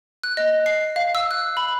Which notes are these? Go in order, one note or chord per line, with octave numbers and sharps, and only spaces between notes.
F#6
D#5
C7
F5
E6
F#6
B5